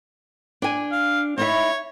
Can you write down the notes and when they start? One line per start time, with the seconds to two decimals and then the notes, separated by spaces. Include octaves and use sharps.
0.62 D4 G#5
0.92 F5
1.38 D#4 E4 C#5 E5